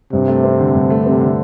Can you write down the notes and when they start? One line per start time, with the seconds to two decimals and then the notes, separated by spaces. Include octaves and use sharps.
0.13 G2 C3
0.28 A3
0.44 C4
0.59 D3
0.75 G2
0.90 A3
1.06 C3 C4
1.21 D3